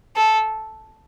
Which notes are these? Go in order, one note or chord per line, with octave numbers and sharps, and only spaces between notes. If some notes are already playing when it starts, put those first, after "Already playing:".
A4